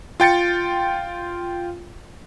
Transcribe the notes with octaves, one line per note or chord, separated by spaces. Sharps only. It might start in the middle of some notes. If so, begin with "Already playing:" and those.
F4 G5 A6 C#7